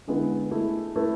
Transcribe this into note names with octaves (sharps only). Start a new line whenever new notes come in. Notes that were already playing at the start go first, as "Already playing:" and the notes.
D3 G#3 B3 E4
A3 E4 G#4
A3 E4 B4